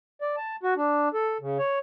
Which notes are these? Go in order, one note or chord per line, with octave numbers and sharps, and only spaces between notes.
D5
A5
F#4
D4
A4
C#3
C#5